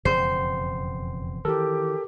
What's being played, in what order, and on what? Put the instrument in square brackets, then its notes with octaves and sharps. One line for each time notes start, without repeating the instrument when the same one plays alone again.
[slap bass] E1 F2 C#3 [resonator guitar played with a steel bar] C5 [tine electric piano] C7
[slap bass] D#3 E3 [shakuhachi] G4 [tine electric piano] A4 A#4